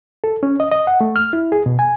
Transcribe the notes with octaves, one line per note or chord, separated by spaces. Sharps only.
A4
C#4
D#5
D#5
F#5
A3
F6
E4
G#4
B2
G#5